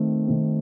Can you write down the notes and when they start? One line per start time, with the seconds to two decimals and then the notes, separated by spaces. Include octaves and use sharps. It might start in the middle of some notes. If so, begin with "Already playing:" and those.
Already playing: D#3 A3 C4
0.27 D#3 A3 C4